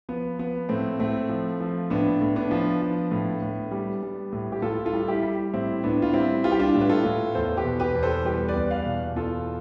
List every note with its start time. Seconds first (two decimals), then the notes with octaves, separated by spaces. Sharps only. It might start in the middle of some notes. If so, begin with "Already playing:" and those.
0.09 F3 B3
0.39 F3 B3
0.69 A2 A3 C4
0.99 A2 A3 C4
1.29 F3
1.60 F3
1.90 A2 B3 D4
2.21 A2
2.36 B3 D4
2.51 F3
2.82 F3
3.11 A2
3.42 A2
3.71 G3
4.03 G3
4.32 A2
4.52 G4
4.62 A2 F4 A4
4.85 F4 A4
4.93 G3
5.08 E4 G4
5.23 G3
5.53 A2 C4 E4
5.84 A2 B3 D4
6.02 F4
6.13 G3 C4 E4
6.44 G3 F4
6.52 G4
6.59 D4 F4
6.75 A2
6.81 B4
6.89 F4 A4
7.04 A2
7.35 E2 A4 C5
7.57 G4 B4
7.65 B2
7.80 G4 B4
7.95 E2
8.03 A4 C5
8.25 G3 G4 B4
8.48 B4 D5
8.56 E2
8.71 D5 F5
8.86 B2
9.16 E2 F4 A4